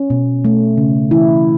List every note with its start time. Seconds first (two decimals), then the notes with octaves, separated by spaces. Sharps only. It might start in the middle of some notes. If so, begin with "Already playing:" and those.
Already playing: C#4
0.10 B2
0.45 A3
0.78 C#3
1.11 E3 E4